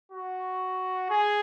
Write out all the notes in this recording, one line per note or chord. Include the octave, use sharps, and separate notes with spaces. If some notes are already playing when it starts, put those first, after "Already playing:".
F#4
G#4